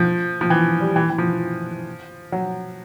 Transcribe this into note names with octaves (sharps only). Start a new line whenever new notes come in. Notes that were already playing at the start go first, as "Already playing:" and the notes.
Already playing: F3
F3
E3
G3
E3
E3
F3
F#3